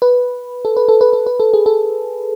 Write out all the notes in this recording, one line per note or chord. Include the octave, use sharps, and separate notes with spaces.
B4
A4
B4
A4
B4
A4
B4
A4
G#4
A4